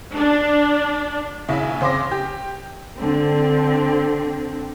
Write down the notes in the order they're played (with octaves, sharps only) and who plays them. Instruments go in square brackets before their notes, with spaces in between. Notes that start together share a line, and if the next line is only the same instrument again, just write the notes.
[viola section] D4
[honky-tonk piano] A#1 C#3 E4 E5
C#3 C4 C6 D6 A#6
G4
[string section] D3 C4